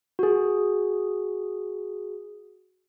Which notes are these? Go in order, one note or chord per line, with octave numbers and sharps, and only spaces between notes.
F#4 G#4